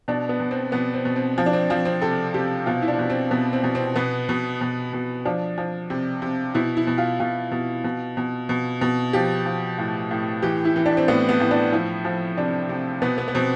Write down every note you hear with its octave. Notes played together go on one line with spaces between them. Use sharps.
B2 D4
B3
B2
C4
B2 B3
C4
B2
C4
F3
D4
C4
F3 C4
C4
C3 A4
C3 G4
B2 F4
E4
D4
B2
C4
B2 B3
C4
B2
C4
B2 B3
B2
B2
B2
F3 D4
F3
C3
C3
B2 E4
E4
B2
F4
B2 F4
B2
B2
B2
B2
B2
F3 G4
F3
A2
A2
E3 G4
E4
E3
D4
C4
A2 B3
B3
A2
D4
F3 E4
F3
C3 D4
C3
B2 B3
B3
B3
B2 C4